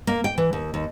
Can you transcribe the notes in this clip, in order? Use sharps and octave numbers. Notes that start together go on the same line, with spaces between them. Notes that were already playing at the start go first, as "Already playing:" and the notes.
A#3
G5
E3
D#2
D#2